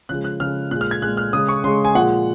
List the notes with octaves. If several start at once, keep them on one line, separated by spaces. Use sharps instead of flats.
C#3 F3 G#3 F#6
F#6
C#3 F3 G#3 F6
A#2 G#3 F#6
F6
G#6
A#2 G#3 F#6
F6
C#3 G#3 D#6
C#6
C#3 G#3 C6
G#5
A#2 F3 G#3 F#5